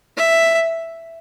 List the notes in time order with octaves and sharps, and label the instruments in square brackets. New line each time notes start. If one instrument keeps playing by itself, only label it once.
[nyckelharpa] E5